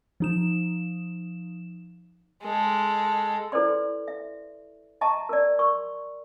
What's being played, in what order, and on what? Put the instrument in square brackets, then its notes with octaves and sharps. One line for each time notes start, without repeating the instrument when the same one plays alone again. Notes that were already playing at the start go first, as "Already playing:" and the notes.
[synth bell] F3 D#4 E7
[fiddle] G#3 A4
[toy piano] E4 A4 B4 C5 D5 C6
E5
D#5 E5 A5 A#5 C#6
A#4 D5
A#4 C6 C#6